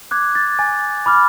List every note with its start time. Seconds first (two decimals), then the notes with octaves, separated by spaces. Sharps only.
0.11 D6 F#6 G#6
0.35 A6
0.59 G#5 A6
1.06 B5 D6 F6